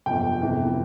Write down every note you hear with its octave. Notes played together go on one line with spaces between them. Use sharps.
G1 F2 C3 G5
G1 F2 C3 E3